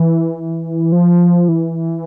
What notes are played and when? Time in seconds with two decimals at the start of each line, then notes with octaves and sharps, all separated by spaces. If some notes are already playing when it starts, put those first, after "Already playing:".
Already playing: E3
0.92 F3
1.48 E3